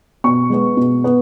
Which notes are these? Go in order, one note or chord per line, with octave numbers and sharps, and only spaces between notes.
B2 C#6
G#3 B3
B2
B3